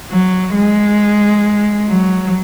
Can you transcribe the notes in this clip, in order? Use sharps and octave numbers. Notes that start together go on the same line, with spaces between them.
F#3
G#3
F#3